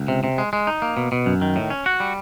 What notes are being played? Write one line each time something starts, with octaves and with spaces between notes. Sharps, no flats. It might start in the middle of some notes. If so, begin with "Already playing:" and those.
Already playing: C#2
C3
C3
G#3
G#3
D#4
A#3
B2
B2
F#2
D#3
A2
C#4
F#4
G3